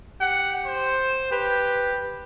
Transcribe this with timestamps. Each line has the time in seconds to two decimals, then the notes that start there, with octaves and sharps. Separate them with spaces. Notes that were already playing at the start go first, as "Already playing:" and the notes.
0.21 G4 F#5
0.66 C5
1.32 G4 B4